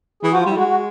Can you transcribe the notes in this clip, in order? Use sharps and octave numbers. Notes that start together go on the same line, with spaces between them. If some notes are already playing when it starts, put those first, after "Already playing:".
E3 G#4
F3 F#4
F4
G3 E4
G#3 F#4
F#4